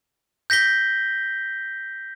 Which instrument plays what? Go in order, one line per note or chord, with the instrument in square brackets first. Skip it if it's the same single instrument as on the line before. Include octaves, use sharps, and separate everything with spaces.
[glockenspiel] G6 A#6 B6 G7